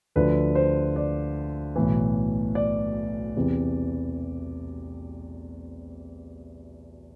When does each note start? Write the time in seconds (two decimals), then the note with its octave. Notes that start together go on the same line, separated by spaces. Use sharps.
0.16 D2 D3 F3 B4
0.55 C5
0.96 D5
1.76 B1 A2 E3
2.55 D5
3.36 E2 C3 E3